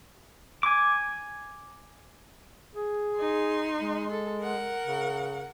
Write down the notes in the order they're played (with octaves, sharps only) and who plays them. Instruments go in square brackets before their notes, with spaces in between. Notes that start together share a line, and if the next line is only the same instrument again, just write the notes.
[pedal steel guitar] G#5 D6
[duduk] G#4
[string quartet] D#4 C6
[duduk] G#3
[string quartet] A4
A#4 F#5
[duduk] C#3